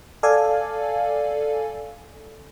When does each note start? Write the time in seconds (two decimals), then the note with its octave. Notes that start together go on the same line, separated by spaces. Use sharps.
0.23 A4 D5 F5 G#5